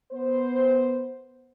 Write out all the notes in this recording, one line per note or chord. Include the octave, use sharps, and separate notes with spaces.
B3 C5